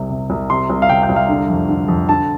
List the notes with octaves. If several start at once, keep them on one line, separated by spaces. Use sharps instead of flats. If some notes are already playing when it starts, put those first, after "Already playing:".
Already playing: C2 C3
C3
C2
C3 C6
C2
F5
C3 G5
G5
C2
F5
D3
F2
D3
F2
D3 A5